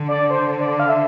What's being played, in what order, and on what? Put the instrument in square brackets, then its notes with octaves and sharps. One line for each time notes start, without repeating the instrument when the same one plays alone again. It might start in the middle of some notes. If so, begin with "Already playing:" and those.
Already playing: [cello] D3
[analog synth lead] D5
C5
D5
F5
E5